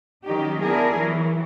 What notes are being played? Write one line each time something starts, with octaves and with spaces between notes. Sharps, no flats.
D#3 F#3 C#4 D#4 G4
B3 D4 E4 G#4 A#4
E3 F#3